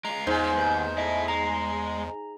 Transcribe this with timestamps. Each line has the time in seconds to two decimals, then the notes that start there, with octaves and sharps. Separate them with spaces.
0.05 G#3 F4 A#5
0.27 E2 G#2 C5
0.57 D#2 B4 G6
0.98 E4 A4 D#5
1.28 G#3 A#5